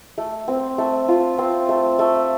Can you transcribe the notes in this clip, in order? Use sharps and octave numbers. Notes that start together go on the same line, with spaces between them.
A3
C4
A3
F4
C4
A3
A3